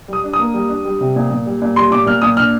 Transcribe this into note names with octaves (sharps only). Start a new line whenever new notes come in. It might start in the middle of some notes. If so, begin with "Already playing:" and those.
G3 D#6
D4
D#6
A#3
G3
D4
G3
C3
A#2
A#2
G3
A#2
G3 C6
A#2 D6
A#2 F6
A#2 D#6
D4 F6